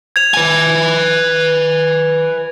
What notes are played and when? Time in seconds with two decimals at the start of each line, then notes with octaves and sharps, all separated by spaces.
0.16 G#6 F7
0.34 B4 G#5